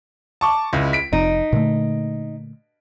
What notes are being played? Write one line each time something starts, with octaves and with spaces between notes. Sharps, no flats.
A5 C#6 D6
C#2 G#3 E4
B6 D7
F1 F2 D#4
A#2 D3 A3